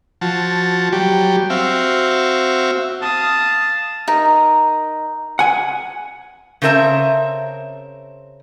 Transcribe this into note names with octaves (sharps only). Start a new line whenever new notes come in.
F3 F#4 A5
F#3 G3 G4
C4 F#4 E5 F5
F5 A5 D#6
D#4 A#4 D#5
F#5 G#5
C#3 C4 A#4 E5 A5